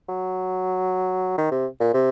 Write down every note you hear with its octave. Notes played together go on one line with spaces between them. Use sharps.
F#3
D#3
C3
A#2
C3